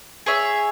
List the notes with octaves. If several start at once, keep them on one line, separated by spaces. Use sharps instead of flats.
G#4 C#5 E5